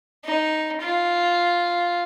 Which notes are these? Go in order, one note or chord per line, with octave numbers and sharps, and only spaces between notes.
D#4
F4